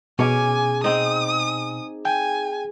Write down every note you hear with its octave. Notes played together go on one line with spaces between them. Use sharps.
B2 C#4 G#4 G#5 D6
C4 D#4 D#6
G5 G#5